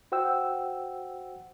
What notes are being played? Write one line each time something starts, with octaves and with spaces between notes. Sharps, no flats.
F#4 C5 F#5 G5 E6